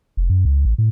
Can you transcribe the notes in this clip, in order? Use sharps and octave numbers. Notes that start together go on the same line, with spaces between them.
F1
F#2
C#2
A1
A2